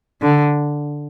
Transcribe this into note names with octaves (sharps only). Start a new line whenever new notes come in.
D3